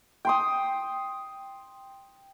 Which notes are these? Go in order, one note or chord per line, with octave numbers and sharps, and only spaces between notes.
G5 C6 D#6